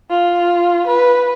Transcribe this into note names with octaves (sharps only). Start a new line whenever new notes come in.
F4
B4